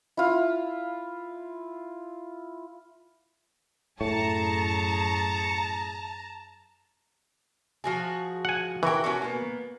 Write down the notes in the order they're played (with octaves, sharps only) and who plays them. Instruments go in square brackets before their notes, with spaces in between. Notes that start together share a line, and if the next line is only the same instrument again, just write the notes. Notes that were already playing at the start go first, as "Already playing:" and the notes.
[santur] E4 F4
[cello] F#2 G#4 [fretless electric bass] A2 [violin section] A5 A#5 [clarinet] C#6
[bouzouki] F3 F#4 G#4
[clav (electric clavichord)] F#5 G#5
[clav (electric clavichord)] E3 [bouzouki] F#4 A#4 G5
[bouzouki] C#4 D4 F#4
A#3 B3